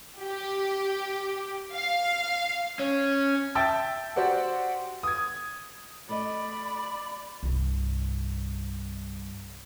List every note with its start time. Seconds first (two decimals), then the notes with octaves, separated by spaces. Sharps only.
0.21 G4
1.73 F5
2.79 C#4
3.55 E5 G5 A5 E6 A6
4.16 F#4 G4 C5 D5 F#5
5.03 D#6 G#6
6.09 A3 A4 D5 D#5 B5
7.43 C2 G2